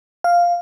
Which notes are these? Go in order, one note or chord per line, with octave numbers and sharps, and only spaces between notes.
F5